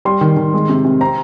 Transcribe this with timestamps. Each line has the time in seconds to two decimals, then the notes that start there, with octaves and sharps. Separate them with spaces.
0.05 G3 C6
0.21 D#3
0.37 D#3
0.54 G#3
0.69 C3
0.85 C3
1.01 C4 A#5